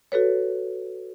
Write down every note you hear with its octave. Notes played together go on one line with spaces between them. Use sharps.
F#4 A4 B4 C#5